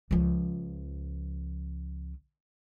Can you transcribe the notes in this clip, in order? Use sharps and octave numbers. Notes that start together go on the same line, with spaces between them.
C#2 F3